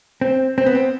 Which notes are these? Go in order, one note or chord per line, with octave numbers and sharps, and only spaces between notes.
C4
C4
B3
C4